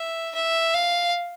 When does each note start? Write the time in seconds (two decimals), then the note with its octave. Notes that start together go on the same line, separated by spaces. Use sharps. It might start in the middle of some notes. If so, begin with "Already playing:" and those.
Already playing: E5
0.35 E5
0.74 F5